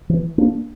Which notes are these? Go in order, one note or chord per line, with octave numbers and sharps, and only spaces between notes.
E3
A#3 D4